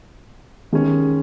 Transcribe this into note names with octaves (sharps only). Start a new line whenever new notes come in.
D#3 G#3 C#4